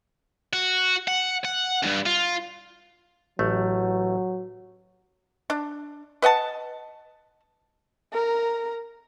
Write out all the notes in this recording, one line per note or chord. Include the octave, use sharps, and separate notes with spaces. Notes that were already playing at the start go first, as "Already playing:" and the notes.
F#4
F#5
F#5
C#2 G2
F4
A1 F#3 A3
D4
B4 D#5 F#5 A5
A#4 A#5